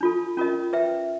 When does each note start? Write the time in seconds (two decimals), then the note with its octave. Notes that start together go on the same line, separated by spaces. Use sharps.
0.01 D4 F4 A4
0.37 C#4 F4 A#4 D#5
0.73 B4 E5 G5